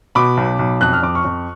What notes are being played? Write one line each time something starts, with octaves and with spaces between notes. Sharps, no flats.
B2 B5 D6
B1
B1
F2 F#6
F6
F2 D6
C#6 F6
F2